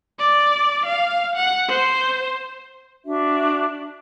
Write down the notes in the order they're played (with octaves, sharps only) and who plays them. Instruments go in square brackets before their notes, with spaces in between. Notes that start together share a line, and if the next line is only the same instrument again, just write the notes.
[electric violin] D5
F5
F#5
C5
[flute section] D4 F#4 E5